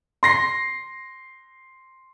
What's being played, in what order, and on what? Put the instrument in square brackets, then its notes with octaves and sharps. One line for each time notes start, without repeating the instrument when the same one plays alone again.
[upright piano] C6 A#6 C7